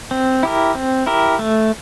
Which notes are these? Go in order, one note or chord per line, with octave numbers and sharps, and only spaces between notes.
C4
E4 G4 A#4
C4
E4 G4 A#4
A3